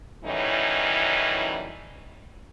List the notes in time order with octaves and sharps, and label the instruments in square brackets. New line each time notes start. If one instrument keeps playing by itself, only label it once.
[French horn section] F#2 A2 E3 G3 C#4 D#4